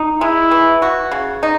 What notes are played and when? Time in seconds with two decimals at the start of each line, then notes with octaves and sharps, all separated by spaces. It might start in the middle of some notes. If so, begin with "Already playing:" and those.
Already playing: D#4
0.21 G#3 E4
0.51 E3
0.82 F#4
1.12 C#3
1.43 D#4